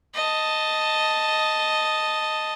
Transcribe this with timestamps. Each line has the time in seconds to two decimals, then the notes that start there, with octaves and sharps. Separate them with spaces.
0.14 D#5 A5